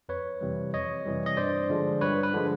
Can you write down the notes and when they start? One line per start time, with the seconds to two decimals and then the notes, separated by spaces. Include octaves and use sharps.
0.09 F2 B4 C#5
0.41 C3 E3 G3
0.74 F2 C#5 D#5
1.05 C3 E3 G3
1.26 D#5
1.37 G2 C5 D5
1.70 D3 F3 G#3
2.01 G2 B4 C#5
2.23 B4
2.33 D3 F3 G#3